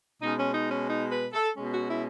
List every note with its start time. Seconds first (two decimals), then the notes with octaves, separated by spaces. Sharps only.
0.20 B2 G#3 C#4 D#4
0.37 C#4
0.54 D#4
0.70 C#4
0.88 D#4
1.10 B4
1.32 A4
1.55 B2 G#3 C#4
1.72 F#4
1.89 E4